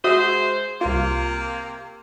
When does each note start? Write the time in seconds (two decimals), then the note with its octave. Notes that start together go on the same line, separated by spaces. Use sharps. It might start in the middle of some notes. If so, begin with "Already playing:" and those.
0.04 G#3 F#4 C5 E5 D#6
0.81 C2 C3 A#3 F4